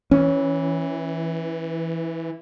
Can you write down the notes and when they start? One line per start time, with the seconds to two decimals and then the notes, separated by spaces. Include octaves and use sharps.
0.11 E3 C#4